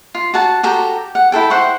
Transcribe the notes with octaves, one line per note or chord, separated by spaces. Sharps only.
F4
F#4 F#5 A5
F#4 G4 A4 A#5
F#5
E4 F4 A4 G5
C5 F#5 G5 C#6